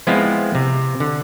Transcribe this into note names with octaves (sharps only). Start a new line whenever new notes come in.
F3 G#3 B3 C4 E4 F4
C3
D3